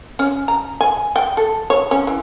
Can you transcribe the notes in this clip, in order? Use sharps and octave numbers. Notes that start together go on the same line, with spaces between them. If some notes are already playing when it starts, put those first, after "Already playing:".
C#4
A#5
G#5
G5
A4
C#5
C#4
E3